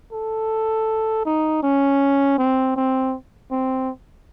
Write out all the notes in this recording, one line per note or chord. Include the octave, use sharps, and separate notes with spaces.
A4
D#4
C#4
C4
C4
C4